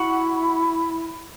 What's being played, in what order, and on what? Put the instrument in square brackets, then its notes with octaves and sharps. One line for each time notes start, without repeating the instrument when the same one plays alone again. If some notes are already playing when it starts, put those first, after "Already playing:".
Already playing: [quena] E4 [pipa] F#4